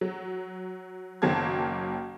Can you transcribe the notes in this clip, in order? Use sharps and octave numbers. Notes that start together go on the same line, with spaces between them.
F#3
F#1 D#3 F#3 A#3 A5 G#6